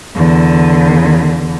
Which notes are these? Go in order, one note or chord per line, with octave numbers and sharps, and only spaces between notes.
E2 D3